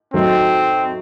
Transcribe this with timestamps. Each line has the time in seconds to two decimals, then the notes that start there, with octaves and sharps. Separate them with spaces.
0.13 F#3 A3 C4 D#4